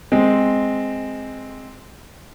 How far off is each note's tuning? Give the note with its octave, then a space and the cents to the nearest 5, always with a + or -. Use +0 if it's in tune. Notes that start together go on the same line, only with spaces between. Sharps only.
G#3 +0 C4 +0